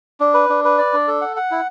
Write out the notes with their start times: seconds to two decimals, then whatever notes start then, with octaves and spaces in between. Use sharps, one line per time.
0.20 D4
0.34 B4
0.49 D4
0.64 B4
0.78 D5
0.93 D4
1.08 A4
1.21 F#5
1.36 F#5
1.51 E4